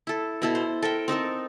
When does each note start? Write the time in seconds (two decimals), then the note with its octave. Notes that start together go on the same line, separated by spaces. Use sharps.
0.07 E4 A4
0.42 B2 E4 A4
0.55 C5
0.82 A4 A#4 E5 G5
1.08 C4 D#4 A4 A#4